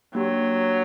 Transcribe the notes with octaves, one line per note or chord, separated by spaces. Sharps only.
F#3 A#3 D4 G4